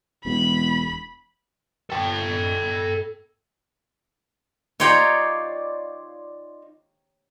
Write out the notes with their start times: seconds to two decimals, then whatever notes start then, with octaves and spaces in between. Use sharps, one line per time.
0.25 E1 B5
1.90 A4 G5
4.80 D#4 F4 C#5 D5 G5 A#5